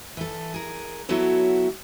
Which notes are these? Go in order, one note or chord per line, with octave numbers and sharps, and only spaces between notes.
E3 A4
G#4 A#4
F#3 B3 E4 F#4 A4 C#5